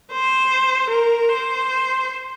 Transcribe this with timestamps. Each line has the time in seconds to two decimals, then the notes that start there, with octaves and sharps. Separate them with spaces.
0.12 C5
0.90 A#4
1.29 C5